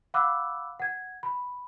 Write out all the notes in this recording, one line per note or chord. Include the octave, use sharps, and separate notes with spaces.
F5 F#5 B5 D6 E6 F#6
F#5 G#6
B5